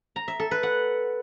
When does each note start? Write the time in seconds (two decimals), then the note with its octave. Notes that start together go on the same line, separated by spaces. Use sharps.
0.16 A#5
0.28 E5
0.40 A4
0.51 B4
0.63 F#5